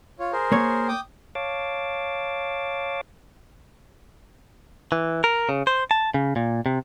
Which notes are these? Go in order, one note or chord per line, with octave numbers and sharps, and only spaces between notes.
F4 C#5
G#4 A#4 C5
A#3 C#5
G5 D6 D#6
C#5 F5 A5 D6
E3
A#4
C#3
C5
A5
C#3
A#2
C3